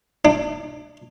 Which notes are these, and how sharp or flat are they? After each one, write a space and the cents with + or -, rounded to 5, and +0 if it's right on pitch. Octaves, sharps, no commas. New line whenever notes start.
D4 +30